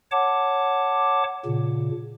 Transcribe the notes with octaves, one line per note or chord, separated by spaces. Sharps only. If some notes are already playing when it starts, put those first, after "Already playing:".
C#5 F#5 A5 D6
A#2 C#3